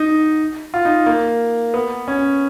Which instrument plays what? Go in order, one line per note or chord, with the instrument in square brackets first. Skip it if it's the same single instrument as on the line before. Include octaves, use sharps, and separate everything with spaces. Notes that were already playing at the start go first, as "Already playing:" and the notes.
Already playing: [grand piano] D#4
F4
D#4
A#3
B3
C#4